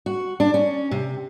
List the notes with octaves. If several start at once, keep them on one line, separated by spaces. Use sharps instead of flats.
F#4
D4
C#4
C3